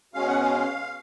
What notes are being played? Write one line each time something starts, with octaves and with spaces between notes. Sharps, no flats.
B2 G#3 C#4 F5
F#5
F5